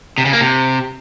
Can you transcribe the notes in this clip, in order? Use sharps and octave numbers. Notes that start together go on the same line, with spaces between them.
C3
C#3
A#3
C3